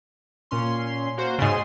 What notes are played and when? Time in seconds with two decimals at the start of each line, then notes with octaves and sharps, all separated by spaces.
0.51 A#2 C#4 C6
1.17 A#3 F#4 C5
1.39 G#2 C#3 G#4 C6